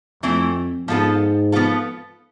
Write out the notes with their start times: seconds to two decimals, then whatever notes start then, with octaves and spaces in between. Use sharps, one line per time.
0.23 F2 E3 A3 C4 E4
0.88 G#2 F3 B3 F4 A4
1.52 F3 B3 F4 A4